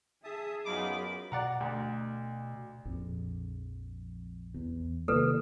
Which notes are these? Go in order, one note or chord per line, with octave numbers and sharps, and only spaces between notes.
G#4 E5 A5 D#6
F#2 F#3 B3 D#4 F4 B5 D6
B2 D5 F#5 A#5
D2
A#1 F2
E2
C3 D#3 A#3 A4 B4